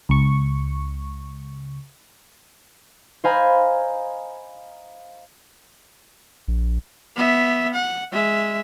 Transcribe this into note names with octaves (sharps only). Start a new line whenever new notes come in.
C#2 C#6
C5 D#5 F5 G#5 A#5 B5
A#1
B3 E5
F#5
G#3 E5